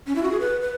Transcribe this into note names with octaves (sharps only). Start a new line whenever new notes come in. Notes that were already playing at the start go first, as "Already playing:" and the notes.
C#4
E4
F#4
G#4
B4
B4